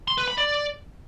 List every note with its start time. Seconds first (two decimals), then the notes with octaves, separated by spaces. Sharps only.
0.08 C6
0.18 B4
0.28 B5
0.38 D5